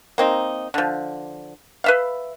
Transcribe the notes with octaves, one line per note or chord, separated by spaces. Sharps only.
A#3 C4 D#4
D3 F3
B4 E5 F5